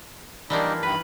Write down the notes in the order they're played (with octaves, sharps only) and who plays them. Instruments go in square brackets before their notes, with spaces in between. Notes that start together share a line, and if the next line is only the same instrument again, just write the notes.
[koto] E3 F3 A#3 [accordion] G3 D4 D#4
[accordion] G2 D#3 [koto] B4 [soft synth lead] B5